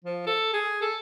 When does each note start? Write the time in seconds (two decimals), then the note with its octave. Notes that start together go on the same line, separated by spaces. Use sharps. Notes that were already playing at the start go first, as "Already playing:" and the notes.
0.05 F3
0.26 A4
0.53 G#4
0.81 A4